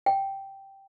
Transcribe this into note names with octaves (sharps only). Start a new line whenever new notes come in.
G5